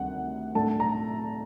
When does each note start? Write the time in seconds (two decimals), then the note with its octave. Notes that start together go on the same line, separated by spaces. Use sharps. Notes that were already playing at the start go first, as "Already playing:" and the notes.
Already playing: D2 C3 D#3 G3 D4 F#5
0.55 A2 A3 D4 A5
0.80 A#5